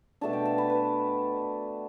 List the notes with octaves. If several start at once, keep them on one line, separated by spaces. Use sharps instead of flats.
B2 A3 D4 A5
G5
A5
B5
B4